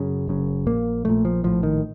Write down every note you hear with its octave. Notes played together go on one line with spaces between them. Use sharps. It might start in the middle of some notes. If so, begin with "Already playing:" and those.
Already playing: F#2 C#3
F#1 F#2 C#3
A#1 A#2 A#3
A#1 A#2 A3
F3
A#1 A2 F3
D#3